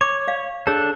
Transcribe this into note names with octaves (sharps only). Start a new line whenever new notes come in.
C#5 D6
D5 F5
D4 G#4 A4 C#5